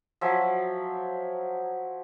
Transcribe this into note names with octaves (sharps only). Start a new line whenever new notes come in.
F3 F#3 E5 G#5